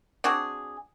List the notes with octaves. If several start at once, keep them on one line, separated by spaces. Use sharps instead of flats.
C4 D4 F#4 G#4